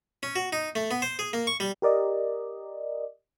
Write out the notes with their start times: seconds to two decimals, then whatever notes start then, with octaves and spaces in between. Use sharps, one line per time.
0.23 C#4
0.36 F#4
0.53 D#4
0.75 A3
0.91 B3
1.02 C5
1.19 G#4
1.33 A#3
1.47 C#6
1.60 G3
1.82 G4 A#4 D5 D#5